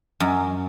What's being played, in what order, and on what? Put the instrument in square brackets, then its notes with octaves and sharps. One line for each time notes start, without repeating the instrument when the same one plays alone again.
[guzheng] F#2